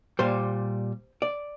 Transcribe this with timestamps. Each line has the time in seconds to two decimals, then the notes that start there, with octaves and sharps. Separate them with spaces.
0.19 A#2 G3 C5
1.22 D5